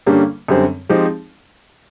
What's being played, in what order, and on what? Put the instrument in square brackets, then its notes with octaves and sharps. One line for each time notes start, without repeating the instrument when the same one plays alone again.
[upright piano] G2 D3 G3 A#3 C#4
F#2 D3 G3 C4
F3 G#3 C4 D#4 G4